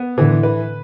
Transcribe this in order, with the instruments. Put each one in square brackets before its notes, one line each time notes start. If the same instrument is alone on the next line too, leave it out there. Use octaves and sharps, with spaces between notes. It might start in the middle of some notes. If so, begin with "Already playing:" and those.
Already playing: [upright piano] B3
[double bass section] A2 D3 [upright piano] E3
[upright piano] B4